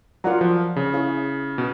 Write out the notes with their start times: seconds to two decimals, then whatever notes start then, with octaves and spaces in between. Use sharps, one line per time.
0.24 F#3 F4 A#4 D5 F#5 A#5
0.41 F3
0.76 C#3
0.94 E4 G#4 C#5 F5
1.58 B2